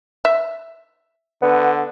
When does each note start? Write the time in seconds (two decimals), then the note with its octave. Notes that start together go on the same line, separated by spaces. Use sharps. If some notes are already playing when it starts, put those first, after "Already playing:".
0.25 E5
1.42 D3 B3